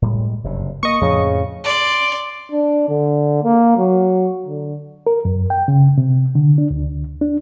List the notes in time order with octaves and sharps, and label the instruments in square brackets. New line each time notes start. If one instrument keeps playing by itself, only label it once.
[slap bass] A2 G3 G#3
F#1 G2 C3
[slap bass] A#3 [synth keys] D#5 C#6
[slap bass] F2 A2 F3 [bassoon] C#3
[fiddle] D5 C6
[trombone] D4
D3
A#3
F#3
D3
[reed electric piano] A#4
F#2
G5
C#3
C3
D3
D4
D2
D4